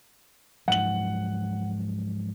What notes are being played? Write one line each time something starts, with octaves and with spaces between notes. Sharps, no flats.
G#2 F3 F#3 F#5 F#7